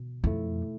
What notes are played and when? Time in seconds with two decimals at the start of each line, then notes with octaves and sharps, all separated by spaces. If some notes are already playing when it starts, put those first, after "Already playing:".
Already playing: B2
0.24 F2 A3 E4